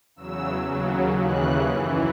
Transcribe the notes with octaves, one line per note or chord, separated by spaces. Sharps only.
E2 C#3 F#3 E6
D#2 C#3 F#3
D#2 C#3 E3 F#6
F#2 E3